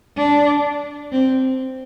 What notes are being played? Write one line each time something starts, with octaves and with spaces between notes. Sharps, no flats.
D4
C4